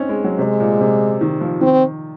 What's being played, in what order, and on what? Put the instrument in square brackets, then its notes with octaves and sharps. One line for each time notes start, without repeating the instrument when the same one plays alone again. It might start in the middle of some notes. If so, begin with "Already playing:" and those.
Already playing: [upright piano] C4 C#4 D#4
G#3
F#3
[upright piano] C3 [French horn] G#3
[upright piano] A#2
C3
D#3
F3
[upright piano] D#3 [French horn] C4